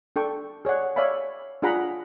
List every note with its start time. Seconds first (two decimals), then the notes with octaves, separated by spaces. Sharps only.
0.16 D4 A4 G5 C#6
0.65 G#4 C#5 D5 F#5
0.96 C#5 D5 E5 F5 G#5 B5
1.62 D4 F4 G#4 F#5 A#5 B5